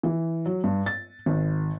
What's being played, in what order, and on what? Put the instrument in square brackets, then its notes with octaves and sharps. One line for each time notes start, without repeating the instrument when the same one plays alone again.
[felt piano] E3
F#3
G2
A6
G#1